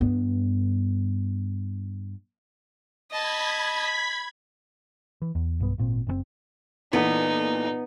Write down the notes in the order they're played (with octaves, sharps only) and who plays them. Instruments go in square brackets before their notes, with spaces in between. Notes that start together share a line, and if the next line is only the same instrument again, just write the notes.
[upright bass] G2 B3
[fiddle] D#5 A5 [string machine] B5 G#6 B6
[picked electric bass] E3
E2
B1 G2 B3
G#1 A#2 C4
F#1 B2 C4
[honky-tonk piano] A#2 E3 A4 [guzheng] B3 [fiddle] D#4